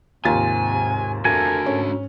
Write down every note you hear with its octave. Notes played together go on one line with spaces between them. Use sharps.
D#2 G#2 C3 F4 G#5 A6
F2 D4 F#4 A4 A#4 G#5
G#2 C#4